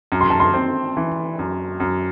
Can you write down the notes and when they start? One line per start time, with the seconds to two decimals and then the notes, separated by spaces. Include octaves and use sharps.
0.12 F#2
0.21 C6
0.30 A5
0.40 C6
0.54 C4
0.97 E3
1.39 F#2
1.80 F#2